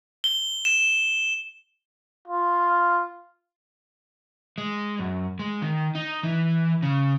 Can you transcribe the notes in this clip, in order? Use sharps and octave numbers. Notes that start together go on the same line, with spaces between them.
G7
E7
F4
G#3
F#2
G#3
D#3
D#4
E3
C#3